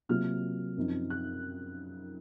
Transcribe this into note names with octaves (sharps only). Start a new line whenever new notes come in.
C3 F#3 A#3 F4 F6
F#2 F3 C4 D#4
F#6